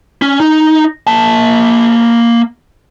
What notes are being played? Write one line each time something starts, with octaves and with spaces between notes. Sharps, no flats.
C#4
D#4
A#3 A5